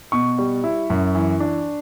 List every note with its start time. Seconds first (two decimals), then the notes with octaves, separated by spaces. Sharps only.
0.12 B2 C#6
0.39 G3
0.64 E4
0.90 F#2
1.15 E3
1.40 D4